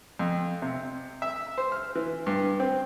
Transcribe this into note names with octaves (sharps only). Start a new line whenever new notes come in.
F2
C3
E5
C5
F6
E3
G2
C4